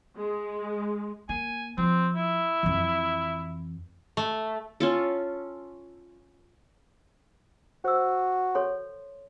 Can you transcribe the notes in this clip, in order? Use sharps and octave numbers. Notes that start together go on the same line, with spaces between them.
G#3
A#3 G#5
F3 C4
E4
F2 E3
A3
C#4 F4 A4
F#4 C5 E6
A4 C#5 C6